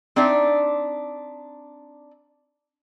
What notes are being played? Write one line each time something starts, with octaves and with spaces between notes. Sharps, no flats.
C4 D4 D#4 D5 E5